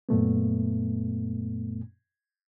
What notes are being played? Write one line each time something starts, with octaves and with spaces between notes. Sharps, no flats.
F#2 A#2 A3 B3